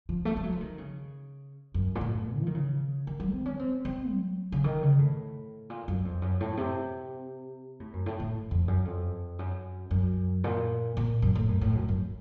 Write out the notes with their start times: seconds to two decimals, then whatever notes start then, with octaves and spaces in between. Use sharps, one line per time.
0.09 F3
0.25 A3
0.37 A3
0.44 F#3
0.52 F3
0.61 D#3
0.78 C#3
1.74 F#2
1.95 A#2
2.01 A2
2.38 F3
2.47 D#3
2.55 C#3
3.07 D#3
3.20 F#3
3.32 C4
3.46 C#4
3.59 C4
3.85 C4
4.12 F#3
4.52 C#3
4.64 D#3
4.83 C#3
4.99 A2
5.70 A#2
5.88 F#2
6.05 F2
6.22 F#2
6.41 A2
6.57 C3
7.80 A2
7.93 F#2
8.06 A2
8.20 A2
8.51 F2
8.68 F#2
8.85 F2
9.39 F#2
9.91 F#2
10.44 A#2
10.97 A#2
11.22 F#2
11.35 A2
11.49 F#2
11.61 A2
11.75 F#2
11.88 F#2